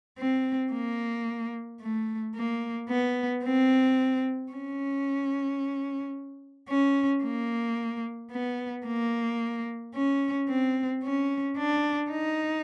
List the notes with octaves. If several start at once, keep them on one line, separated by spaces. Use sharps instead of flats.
C4
A#3
A3
A#3
B3
C4
C#4
C#4
A#3
B3
A#3
C#4
C4
C#4
D4
D#4